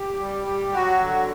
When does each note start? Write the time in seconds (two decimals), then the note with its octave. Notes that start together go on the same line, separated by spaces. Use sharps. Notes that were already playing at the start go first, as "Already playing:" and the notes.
Already playing: G4
0.19 G3
0.47 G3
0.73 F#3 F#4
1.00 D3